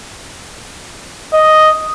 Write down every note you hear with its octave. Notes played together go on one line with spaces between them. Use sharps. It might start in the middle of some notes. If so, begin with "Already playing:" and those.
D#5